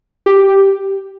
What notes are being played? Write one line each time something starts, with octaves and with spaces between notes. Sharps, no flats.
G4